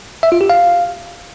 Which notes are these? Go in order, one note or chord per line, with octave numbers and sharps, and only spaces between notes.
E5
F4
G4
F5